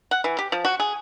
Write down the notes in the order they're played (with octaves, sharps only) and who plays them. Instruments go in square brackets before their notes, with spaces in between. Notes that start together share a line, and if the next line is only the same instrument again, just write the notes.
[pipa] F#5
E3
G4
F3
F#4
G#4